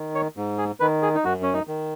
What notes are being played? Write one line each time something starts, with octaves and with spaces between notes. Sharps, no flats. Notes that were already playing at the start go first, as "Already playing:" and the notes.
Already playing: D#3
C#5
G#2
G#4
D#3 B4
G#4
D#4
F#2 F#4
C#4
D#4
D#3